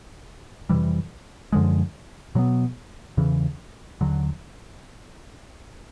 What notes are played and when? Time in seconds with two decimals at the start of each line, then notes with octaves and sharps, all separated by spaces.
0.69 F2 C3 E3 G3
1.52 F#2 D3 F3 G#3
2.35 B2 F#3 B3
3.17 E2 C#3 E3
4.01 D#2 D3 F#3